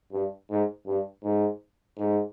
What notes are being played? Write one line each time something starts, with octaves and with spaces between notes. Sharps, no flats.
G2
G#2
G2
G#2
G#2